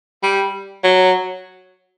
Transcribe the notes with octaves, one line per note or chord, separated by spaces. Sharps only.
G3
F#3